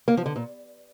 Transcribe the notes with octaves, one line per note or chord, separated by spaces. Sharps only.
A#3
F3
D3
A#2